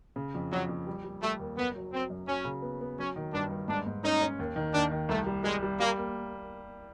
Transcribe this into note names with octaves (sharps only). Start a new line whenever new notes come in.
C#3
F2
F2 F#3
F2
G3
G3
G3 A3
D#2
F#1 B3
F#3
F#3 C4
F#2
F#3 C#4
C#3
B3
B3
F#3 C#4
D#3
G2 D4
G2
G#2 D4
G#2
C#4 D#4
C#4
D#2
D#3
D#2 D4
D#3
C2 A3
G3
G3 G#3
G3
G3 A#3
A#3